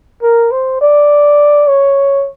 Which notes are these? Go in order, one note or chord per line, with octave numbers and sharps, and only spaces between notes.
A#4
C5
D5
C#5